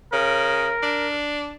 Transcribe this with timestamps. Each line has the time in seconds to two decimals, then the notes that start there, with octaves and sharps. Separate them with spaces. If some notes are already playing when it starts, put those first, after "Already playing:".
0.13 C#3 A#4
0.83 D4